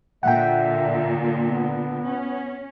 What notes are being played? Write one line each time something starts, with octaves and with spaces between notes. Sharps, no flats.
A#2 D3 E5 F#5 G5
B3
C#4